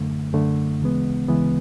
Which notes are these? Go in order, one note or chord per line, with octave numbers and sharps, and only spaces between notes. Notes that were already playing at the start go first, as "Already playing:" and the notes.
Already playing: F#2 D3 A3
F#2 D3 A3
D2 C#3 E3 G#3 B3
D2 C#3 E3 G#3 B3